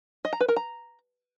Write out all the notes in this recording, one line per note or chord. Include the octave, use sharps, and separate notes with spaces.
D#5
A#5
B4
A#4
A#5